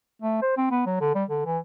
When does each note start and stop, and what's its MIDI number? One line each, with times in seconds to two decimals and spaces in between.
0.22 0.38 57
0.42 0.56 72
0.57 0.66 60
0.71 0.82 59
0.86 1.00 54
1.01 1.14 50
1.15 1.24 55
1.29 1.42 50
1.45 1.58 52